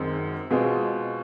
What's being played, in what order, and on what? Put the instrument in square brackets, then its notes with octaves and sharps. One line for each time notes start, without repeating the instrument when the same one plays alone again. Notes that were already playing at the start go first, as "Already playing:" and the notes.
Already playing: [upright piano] F#2 D#3 G#3 C4
B2 G#3 C4 F4 G#4